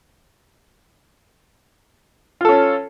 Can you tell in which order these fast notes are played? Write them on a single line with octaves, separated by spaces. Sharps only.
F4 A4 C#4